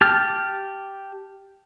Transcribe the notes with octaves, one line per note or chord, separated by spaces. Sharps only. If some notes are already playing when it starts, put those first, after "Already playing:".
G4 A5 F6